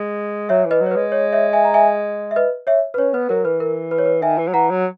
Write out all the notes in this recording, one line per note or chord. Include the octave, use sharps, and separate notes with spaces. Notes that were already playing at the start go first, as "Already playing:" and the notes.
Already playing: G#3
F#3 C#5 E5
E3
B4 D#5
F#3
C#5
B4
G#3
C#5
C#5 E5
E5 G#5
A#5
E5 G#5
E5
B4 D#5
C#5 E5
B4
C#4 C#5
B3 B4
F#3 A#4
E3 B4
A#4
B4
C#5
B4
D#3 E5 G#5
E3
F#3
E3 F#5 A#5
F#3